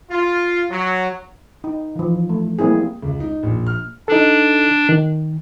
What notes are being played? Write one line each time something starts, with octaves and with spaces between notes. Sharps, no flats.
F4
F#3
D#4
E3 F3
A3
G3 A#3 C4 E4 G#4
C#2
D#4
A#1
F6
D4 D#4 A4
D#3